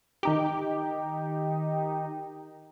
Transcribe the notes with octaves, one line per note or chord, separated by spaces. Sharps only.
D#3 D#4 G4